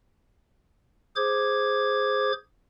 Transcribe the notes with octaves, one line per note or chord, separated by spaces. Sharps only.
G#4 C5 D6 G#6